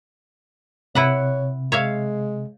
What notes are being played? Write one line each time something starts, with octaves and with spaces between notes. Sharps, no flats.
C3 E4 B4 C#5 F#5
G#3 C#5 E5 F5